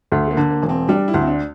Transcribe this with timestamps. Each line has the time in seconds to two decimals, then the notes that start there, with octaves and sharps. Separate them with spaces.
0.12 D2 A3
0.27 A3
0.31 A#3
0.37 D3
0.50 A#3
0.62 E1
0.69 C4
0.89 G3 D4
1.08 E4
1.14 D2
1.21 C4
1.27 D4